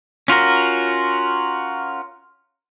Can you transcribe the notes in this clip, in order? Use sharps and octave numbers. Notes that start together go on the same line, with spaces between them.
C#4 F4 F#4 A#4